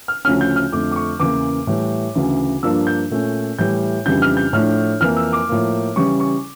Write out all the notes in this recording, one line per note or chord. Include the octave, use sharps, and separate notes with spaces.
F6
D2 C#3 F3 A3 C#4 F6
G6
F6
F2 D3 A3 D6
D6
C#6
E2 C#3 E3 A#3 D6
A2 E3 G3
D2 C#3 E3
G2 F3 A#3 D4 E6
G6
A#2 A3 C#4
A2 E3 G3 G6
F2 C#3 E3 G3 D4 G6
F6
G6
A2 F3 A3 D4 F6
F2 E3 A#3 F6
E6
D6
A2 F3 A#3
C#3 E3 G3 C#4 C#6
C#6